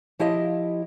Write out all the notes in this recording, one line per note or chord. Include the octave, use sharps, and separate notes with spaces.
F3 E4 G4 D#5 F5